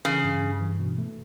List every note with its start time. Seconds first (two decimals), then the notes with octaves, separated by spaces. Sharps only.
0.05 C#3 E3
0.24 G2
0.42 G2
0.61 E3
0.80 B2
0.98 A3